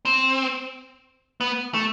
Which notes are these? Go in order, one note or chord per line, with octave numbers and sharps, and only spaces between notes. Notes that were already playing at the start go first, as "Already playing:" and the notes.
C4
B3
A3